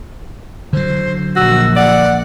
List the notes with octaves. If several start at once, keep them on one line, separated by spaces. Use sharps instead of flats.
D3 F#3 C5
A#1 F#4 E6
D5 F#5